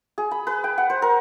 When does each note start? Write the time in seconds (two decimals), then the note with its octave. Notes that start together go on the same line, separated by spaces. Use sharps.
0.18 G#4
0.31 B5
0.47 B4
0.64 G5
0.78 F#5
0.90 C5
1.02 A#4